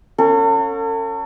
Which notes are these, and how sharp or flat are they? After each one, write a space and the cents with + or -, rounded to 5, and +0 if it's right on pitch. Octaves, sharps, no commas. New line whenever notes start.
C#4 +0 A4 +45 F#5 -40